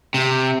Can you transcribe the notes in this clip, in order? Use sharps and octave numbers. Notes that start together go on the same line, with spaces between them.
C3